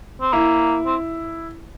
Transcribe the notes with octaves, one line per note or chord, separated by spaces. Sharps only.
C4
A#3 E4
C4